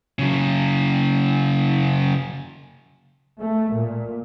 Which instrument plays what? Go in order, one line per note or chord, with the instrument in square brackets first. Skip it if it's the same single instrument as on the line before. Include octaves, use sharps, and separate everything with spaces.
[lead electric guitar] C#3 F#3
[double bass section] A3
A#2